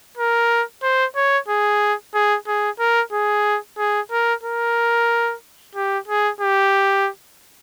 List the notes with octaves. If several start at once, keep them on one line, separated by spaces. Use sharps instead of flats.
A#4
C5
C#5
G#4
G#4
G#4
A#4
G#4
G#4
A#4
A#4
G4
G#4
G4